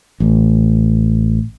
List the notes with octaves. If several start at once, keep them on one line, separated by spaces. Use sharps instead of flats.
A1